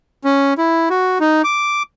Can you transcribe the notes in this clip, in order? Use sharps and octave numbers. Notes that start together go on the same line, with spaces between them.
C#4
E4
F#4
D#4
D6